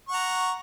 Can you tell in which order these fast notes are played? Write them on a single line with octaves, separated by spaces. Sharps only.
C#6 F#5 A#5